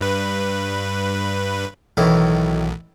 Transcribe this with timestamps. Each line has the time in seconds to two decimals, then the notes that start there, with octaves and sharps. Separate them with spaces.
0.01 G2 B4
1.97 B1 A2 D#3 E3